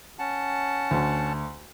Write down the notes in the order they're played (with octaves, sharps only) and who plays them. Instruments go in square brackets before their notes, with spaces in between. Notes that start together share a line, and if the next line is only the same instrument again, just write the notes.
[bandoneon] C#4 F#5 A5
[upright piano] D2